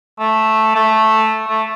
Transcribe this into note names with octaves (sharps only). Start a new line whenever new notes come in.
A3
A3
A3